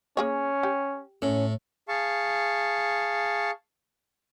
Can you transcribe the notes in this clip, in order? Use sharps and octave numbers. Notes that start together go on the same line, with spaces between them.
A#3 C#4 G#4 C#5
G4
A2 C#4
G#4 F5 A5 C#6